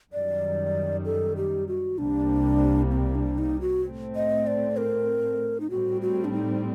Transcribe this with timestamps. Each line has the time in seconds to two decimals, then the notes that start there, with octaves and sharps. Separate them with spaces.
0.13 F#2 D#3 G3 D5
1.05 A4
1.36 G4
1.68 F#4
1.98 C2 C3 G3 A#3 D4
2.91 C4
3.15 D4
3.38 D#4
3.61 F#4
3.84 A2 A3 C4
4.16 D#5
4.47 D5
4.77 A#4
5.60 D#4
5.70 A2 G3 C4 F#4
6.02 F#4
6.24 D4
6.33 D#4